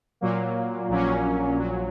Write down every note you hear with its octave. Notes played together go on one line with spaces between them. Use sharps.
A#2 F#3 A#3
A#1 A#2 F#3 A#3 C#4
A#1 A#2 F#3